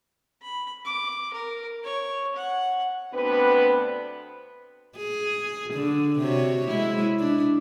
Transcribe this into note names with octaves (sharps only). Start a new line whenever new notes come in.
B5
D6
A#4
C#5
F#5
D2 B3 C4 D4 B4
G#4
D3
C3 F#4 C#5
G#3 E4
D4